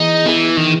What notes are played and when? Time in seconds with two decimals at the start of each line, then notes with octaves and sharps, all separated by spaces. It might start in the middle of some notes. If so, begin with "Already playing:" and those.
Already playing: E3 B3 D#4 E4 G#4
0.26 E3 B3 E4 G#4
0.57 D#3 E3